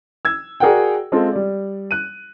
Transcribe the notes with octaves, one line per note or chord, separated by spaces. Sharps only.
E6 G#6
F#4 G#4 A#4 D5 F#5 G5
G#3 C4 F4 A4
G3 D5
F#6 D#7